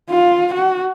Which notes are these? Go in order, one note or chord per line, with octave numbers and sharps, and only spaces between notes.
F4
F#4